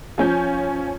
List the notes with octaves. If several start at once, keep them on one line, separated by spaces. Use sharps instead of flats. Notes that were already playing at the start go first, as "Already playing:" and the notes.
F3 C#4 G6